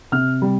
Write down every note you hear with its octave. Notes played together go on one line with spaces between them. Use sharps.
C3 F6
G3